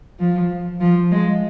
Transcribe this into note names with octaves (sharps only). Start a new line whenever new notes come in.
F3
F3
G#3